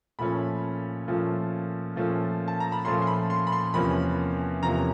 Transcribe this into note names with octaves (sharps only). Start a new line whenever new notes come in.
A#2 F3 A3 C#4 B5
A#2 F3 A3 C#4
A#2 F3 A3 C#4
A5
A#5
B5
A#2 F3 A3 C#4 C6
C6
B5
C6
B5
C6
E2 C3 F3 A#3 C#4 B5
E2 C3 F3 A#3 C#4 A#5